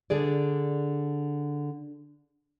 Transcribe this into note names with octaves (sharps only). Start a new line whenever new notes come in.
D3 D4 G#4 D5